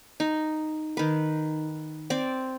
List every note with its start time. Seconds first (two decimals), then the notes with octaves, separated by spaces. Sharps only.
0.20 D#4
0.97 D#3 B4
2.10 C4 D5